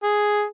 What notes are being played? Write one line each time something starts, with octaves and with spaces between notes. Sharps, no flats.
G#4